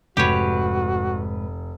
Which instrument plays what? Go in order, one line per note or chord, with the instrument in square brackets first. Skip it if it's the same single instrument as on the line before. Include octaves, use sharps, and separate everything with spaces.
[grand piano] F1 [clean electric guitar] G#2 B4 [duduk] F#4 [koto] G4 C#5